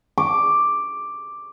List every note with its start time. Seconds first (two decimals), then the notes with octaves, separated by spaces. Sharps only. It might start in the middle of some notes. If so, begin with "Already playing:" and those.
0.18 D6